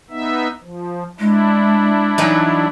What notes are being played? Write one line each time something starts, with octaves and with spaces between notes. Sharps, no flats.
B3 D#4 E5
F3
G#3 D4 E4
E3 F#3 D#4